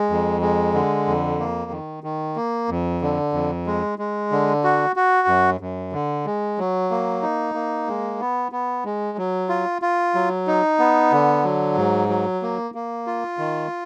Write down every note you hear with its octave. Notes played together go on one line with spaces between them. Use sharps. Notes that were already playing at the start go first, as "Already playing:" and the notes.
Already playing: G#3
F2
G#3
D3
F2
A#3
D#3
D#3
A#3
F2
D3
F2
G#3
G#3
D3
F#4
F#4
F#2
F#2
D3
G#3
F#3
A#3
D#4
A#3
G#3
B3
B3
G#3
F#3
F4
F4
F#3
D#4
B3
D3
F#3
G#2
F#3
A#3
A#3
F4
D#3